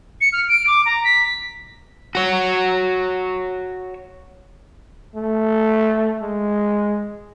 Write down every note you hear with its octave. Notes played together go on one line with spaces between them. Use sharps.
C#7
F6
D7
D6
A#5
B6
F#4 C#5
A3
G#3